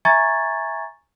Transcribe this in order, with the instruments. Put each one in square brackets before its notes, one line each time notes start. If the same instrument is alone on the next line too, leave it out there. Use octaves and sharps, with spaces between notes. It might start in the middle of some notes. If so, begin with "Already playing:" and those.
[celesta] E5 G#5 A#5 C#6 G#6 A6